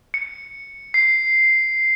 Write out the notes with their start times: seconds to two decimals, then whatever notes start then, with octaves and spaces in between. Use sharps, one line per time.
0.14 C#7
0.94 C7